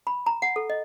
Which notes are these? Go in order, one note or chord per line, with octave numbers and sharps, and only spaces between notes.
B5
A#5
F#5
A4
D#5